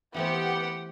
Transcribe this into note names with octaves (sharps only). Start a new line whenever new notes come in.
E3 A3 B3 C4 G4 F#5